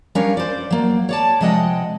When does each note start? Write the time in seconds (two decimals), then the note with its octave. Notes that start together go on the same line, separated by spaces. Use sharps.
0.15 G3 C#4 D4 A#4 C#5 F5
0.37 C5 D5
0.70 F#3 A#3
1.09 C#5 D5 A5
1.40 C3 F3 G#3 D#5 F#5 G5